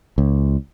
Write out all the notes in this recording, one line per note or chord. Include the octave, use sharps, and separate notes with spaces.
C#2